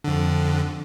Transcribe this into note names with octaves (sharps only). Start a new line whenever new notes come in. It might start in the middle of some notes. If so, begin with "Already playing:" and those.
F2 D3